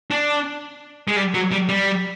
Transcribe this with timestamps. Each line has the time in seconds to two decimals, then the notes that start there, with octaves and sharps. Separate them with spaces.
0.11 D4
1.08 G#3
1.16 G3
1.34 F#3
1.52 G3
1.69 G3